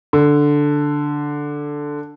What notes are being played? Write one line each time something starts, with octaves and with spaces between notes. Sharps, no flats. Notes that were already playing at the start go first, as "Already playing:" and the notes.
D3